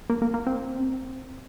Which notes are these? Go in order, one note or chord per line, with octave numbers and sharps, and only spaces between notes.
A#3
A#3
A#3
C4